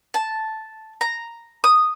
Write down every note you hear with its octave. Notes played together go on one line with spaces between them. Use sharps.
A5
A#5
D#6